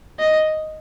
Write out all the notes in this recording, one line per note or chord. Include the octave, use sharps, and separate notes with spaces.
D#5